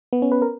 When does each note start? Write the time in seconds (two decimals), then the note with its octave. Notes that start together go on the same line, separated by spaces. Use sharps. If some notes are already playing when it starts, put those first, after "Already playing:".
0.13 B3
0.22 C#4
0.32 B4
0.42 A#4